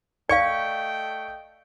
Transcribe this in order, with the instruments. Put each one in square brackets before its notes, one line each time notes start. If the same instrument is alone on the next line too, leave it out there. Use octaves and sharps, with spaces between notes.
[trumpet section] A3 D#5 G5 [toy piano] D5 F5 [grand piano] C#6 C#7